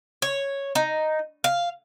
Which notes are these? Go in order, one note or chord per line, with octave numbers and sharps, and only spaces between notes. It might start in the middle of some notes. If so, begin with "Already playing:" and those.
C#5
D#4
F5